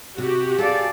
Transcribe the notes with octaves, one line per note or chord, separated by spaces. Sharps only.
C3 F#4 G4
G#4 A4 D5 F5